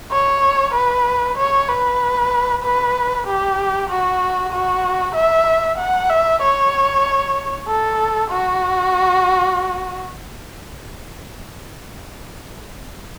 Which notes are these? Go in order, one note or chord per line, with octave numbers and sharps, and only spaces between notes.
C#5
B4
C#5
B4
B4
G4
F#4
F#4
E5
F#5
E5
C#5
A4
F#4